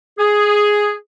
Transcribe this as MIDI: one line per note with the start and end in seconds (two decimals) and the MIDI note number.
0.18 0.93 68